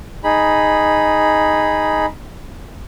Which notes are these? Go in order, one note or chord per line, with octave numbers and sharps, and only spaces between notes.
D#4 G#4 B5